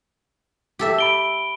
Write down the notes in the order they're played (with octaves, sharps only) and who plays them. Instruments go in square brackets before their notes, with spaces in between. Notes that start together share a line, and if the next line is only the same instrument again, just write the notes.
[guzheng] G4 A4 E5
[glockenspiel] B5 D7 G7